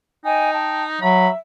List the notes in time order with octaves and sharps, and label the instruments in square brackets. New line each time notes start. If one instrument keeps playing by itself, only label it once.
[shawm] D#4 [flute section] D#5 G5 G#5
[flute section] G5 A5
[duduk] F#3 [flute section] E5 [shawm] B5